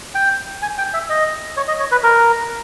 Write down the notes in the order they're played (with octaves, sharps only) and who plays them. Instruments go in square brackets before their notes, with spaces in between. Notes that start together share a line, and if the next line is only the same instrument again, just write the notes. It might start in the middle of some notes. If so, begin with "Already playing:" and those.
[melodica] G5
G#5
G5
E5
D#5
C#5
D#5
C#5
B4
A#4